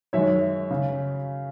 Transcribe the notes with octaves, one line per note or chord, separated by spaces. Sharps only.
F#2 D#3 G#3 C#5 E5
C#3